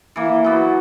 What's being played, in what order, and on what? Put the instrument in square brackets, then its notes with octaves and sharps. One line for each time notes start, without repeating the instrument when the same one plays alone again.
[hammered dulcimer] E3 A#3
F#3 B3